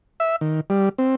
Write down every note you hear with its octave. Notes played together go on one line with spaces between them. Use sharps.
E5
D#3
G3
C4